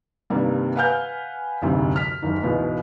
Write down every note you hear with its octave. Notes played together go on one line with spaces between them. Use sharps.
G2 C3 D#3 G3 A#3
B4 F5 F#5 G#5 F6 G6
F#1 D2 G#2 C3
F6 B6
F#1 D#2 D#4
C#2 G#2 B2 E3